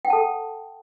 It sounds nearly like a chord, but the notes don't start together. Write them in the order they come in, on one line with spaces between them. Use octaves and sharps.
G5 F#5 A5 A4